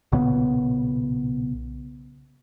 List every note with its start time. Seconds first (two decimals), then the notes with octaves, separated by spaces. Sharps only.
0.12 B1 A#2 C#3 B3